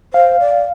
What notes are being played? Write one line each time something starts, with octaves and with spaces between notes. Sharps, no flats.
C5 F5
D5